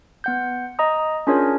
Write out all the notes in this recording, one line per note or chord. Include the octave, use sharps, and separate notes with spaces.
B3 F#5 G6
D#5 A#5 D#6
C#4 D4 F4 G#4 A#4 C#5